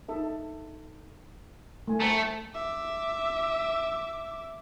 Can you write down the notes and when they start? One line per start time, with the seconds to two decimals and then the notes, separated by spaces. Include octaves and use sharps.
0.08 D#4 A4 E5
1.88 A3 G#5
2.01 A3 C5 G5 A#5
2.55 E5 D6